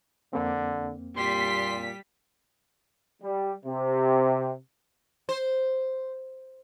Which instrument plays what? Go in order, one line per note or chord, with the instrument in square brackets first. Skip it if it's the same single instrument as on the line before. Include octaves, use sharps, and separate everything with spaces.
[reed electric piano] F2 A#3 C4 [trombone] D3
[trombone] A#2 [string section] G3 B6 [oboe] C6
[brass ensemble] G3
C3
[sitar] C5